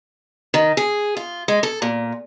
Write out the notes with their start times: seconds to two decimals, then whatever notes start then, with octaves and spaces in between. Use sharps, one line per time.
0.54 D#3
0.77 G#4
1.17 F4
1.48 G#3
1.63 A4
1.82 A#2